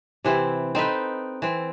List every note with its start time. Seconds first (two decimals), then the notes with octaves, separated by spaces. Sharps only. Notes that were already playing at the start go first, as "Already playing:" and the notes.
0.24 C3 E3 C4 E4
0.75 C4 D#4 A4 B4
1.42 E3 C4